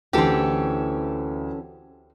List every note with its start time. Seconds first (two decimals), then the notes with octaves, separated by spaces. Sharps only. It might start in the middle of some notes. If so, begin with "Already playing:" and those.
0.13 D2 E3 C4 C#4 G4 A4